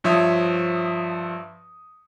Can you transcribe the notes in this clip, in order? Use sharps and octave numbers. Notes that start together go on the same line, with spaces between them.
G2 F3 C#5 E5 D#6